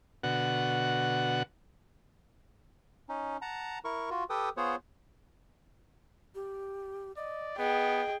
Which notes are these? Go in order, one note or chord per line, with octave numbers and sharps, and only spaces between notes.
B2 D3 F#4 F#5
C#4 D#4
F#5 A5 A#5
E4 A#4 C#6
F4 F#4
G4 A4 B4 G5 D#6
B3 F4 G#4 C5 C#5 F#5
G4
D5 D#5
B3 G#4 D#5 G5